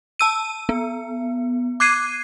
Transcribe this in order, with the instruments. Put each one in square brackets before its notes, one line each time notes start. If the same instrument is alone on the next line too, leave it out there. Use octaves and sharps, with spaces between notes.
[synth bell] A5 E6 D#7
B3
D6 F#6 G#6 C7 D#7